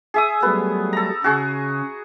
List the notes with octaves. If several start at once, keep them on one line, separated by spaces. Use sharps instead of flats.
G#4 E5 D#6
F#3 G3 A3 B3
A4 A#5
C#3 F#4 G#4 C#6